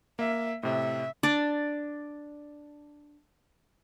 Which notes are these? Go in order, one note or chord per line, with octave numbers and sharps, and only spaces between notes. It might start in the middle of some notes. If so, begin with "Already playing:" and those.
A#3 E5
A2 C3 E5
D4 D5